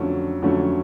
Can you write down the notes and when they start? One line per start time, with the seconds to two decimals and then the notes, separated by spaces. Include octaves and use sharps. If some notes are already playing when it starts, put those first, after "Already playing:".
Already playing: F2 D3 F#3 A3 C#4
0.42 F2 D3 F#3 A3 C#4